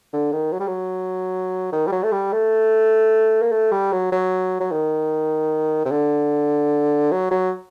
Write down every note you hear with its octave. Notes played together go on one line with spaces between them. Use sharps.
D3
D#3
F#3
G3
F#3
D#3
G3
F#3
A3
G3
A3
A#3
A3
G3
F#3
F#3
F#3
D#3
C3
D3
F#3
F#3